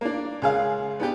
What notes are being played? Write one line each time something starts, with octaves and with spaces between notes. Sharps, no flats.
A#3 D4
C#2 G#4 F5
B3 D4 G4